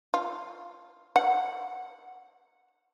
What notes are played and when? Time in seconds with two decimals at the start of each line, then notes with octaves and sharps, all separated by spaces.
0.14 F4
1.16 F#5